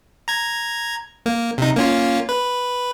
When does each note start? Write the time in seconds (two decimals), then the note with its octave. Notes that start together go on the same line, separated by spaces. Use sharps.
0.28 A#5 G#6
1.26 A#3
1.58 C3 D#4
1.76 A#3 C#4 F4
2.29 B4